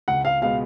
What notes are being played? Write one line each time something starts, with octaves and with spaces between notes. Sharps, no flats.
C#2 F#5
F5
B2 G#3 B3 F5